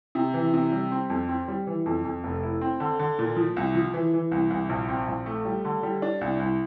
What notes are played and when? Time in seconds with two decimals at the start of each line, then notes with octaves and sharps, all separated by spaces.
0.15 C3
0.34 E3
0.54 C3
0.72 G3
0.92 C4
1.10 F2
1.29 C4
1.48 G3
1.67 E3
1.86 F2
2.05 F2
2.24 F1
2.43 E4
2.61 C4
2.80 D3
2.99 D3
3.19 A#2
3.37 F3
3.57 C2
3.75 F3
3.94 E3
4.13 E3
4.32 C2
4.50 C2
4.69 A#1
4.89 C4
5.08 A#1
5.26 A3
5.45 G3
5.65 D3
5.83 G3
6.02 D4
6.21 C2
6.40 C2